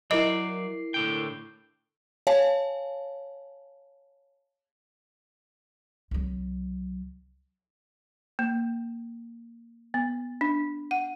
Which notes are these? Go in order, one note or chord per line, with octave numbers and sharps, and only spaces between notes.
F#3 E4 A#4 D5 D#5 C7
A2 D3 G5
C#5 F5 G#5 A5
C2 F#3
A#3
B3
D4
F#5